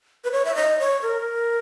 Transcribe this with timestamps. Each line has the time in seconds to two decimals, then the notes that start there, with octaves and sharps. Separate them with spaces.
0.24 B4
0.32 C#5
0.45 E5
0.55 D#5
0.79 C#5
1.02 A#4